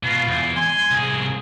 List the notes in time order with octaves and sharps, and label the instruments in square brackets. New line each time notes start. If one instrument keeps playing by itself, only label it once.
[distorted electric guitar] B2 [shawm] F4
[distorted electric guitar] E2
[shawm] G#5 [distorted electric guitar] C6
[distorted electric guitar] C2 G#4